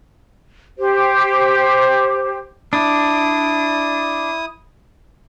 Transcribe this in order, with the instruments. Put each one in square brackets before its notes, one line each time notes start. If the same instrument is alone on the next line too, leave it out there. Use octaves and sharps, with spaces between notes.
[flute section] G4 C5
[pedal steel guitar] D4 [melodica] E4 D#6